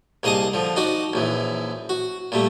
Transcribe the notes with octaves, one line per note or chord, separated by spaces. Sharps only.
C2 A#3 G#4 D#5 A5 D#6
D3 F3
D#4 F#4 D5
A#1 F#2 E3
F#4
A#2 G3 A3